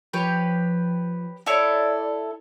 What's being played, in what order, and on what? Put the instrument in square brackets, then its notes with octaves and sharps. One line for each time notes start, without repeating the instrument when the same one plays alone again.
[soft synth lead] F3 [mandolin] G4 B4 C#5
[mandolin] E4 A4 C#5 [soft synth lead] D5